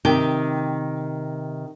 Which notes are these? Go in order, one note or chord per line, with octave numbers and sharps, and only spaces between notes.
C3 D#3 G4 G5